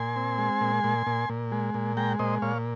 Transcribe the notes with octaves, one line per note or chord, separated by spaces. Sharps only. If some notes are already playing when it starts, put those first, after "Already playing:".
Already playing: A#2 G#5 C6
C4
G#3
A#2
A#2
A#2
A#2
G#3
A#2
G#3 G5 A#5
A#2 C5 D#5
A#2 C#5 F5